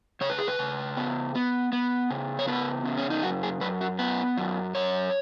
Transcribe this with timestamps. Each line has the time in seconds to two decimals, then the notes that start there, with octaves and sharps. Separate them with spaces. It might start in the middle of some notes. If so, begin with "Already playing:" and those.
0.21 C#3 C#5
0.30 B4
0.38 G#4
0.47 B4
0.59 C#3
0.97 B3
1.35 B3
1.73 B3
2.11 C#3
2.39 C#5
2.47 B3 B4
2.86 C#3
2.97 C#4
3.10 D#4
3.23 F#2 F#4
3.43 G#4
3.61 F#2 B4
3.81 F#4
3.99 B3 B4
4.38 F#2
4.75 F#2 C#5